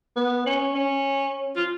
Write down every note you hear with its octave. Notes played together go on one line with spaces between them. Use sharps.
B3
C#4
C#4
F4